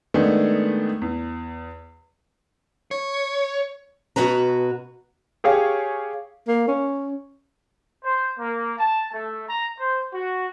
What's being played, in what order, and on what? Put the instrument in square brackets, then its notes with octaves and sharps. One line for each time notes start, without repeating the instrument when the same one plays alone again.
[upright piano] D#3 G#3 A3 B3 D4
E2
[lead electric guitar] C#5
[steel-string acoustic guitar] B2 F#4 B4 A#5
[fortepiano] G4 G#4 C#5 F5
[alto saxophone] A#3
C#4
[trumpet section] C5
A#3
A5
A3
A#5
C5
F#4